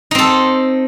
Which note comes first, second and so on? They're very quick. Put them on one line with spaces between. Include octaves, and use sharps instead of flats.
D#4 C4 A4